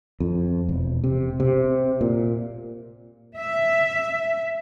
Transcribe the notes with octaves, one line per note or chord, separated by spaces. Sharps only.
F2
E1
C3
C3
A#2
E5